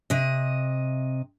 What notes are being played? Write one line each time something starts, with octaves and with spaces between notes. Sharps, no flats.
C3 D#5